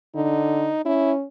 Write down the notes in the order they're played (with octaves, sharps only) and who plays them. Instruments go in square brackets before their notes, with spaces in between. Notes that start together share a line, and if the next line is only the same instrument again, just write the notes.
[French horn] D3 [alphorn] D#4
[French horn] C#4 [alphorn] E4